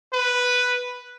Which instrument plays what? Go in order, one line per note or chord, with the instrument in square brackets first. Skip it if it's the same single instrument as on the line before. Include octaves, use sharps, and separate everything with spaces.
[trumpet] B4